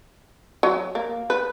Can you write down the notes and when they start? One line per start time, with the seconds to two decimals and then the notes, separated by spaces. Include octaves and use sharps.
0.63 F#3
0.95 A#3
1.30 B4